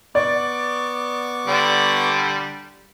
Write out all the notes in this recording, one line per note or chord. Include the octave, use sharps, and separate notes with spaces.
B3 D5 C#6 D6
D3 G3 D4